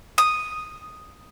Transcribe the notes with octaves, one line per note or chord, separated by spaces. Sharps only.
D#6